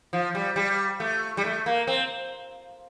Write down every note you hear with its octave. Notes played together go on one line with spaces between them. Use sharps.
F3
G3
G3
A3
G3
A3
A#3
C4